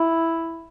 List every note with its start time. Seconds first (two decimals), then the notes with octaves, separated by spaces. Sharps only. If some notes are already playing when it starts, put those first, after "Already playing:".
Already playing: E4